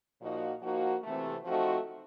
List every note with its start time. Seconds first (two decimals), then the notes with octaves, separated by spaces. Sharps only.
0.20 A#2 F3 A#3 D#4 F#4
0.61 F3 A#3 D#4 F#4
1.03 C3 E3 A3
1.44 F3 A3 C4 D#4 F#4